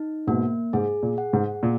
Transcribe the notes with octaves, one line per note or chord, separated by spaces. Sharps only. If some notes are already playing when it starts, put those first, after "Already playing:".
Already playing: D#4
G#2 B2 A#3
G#2 G#4
A#2
F#5
G#2
A#2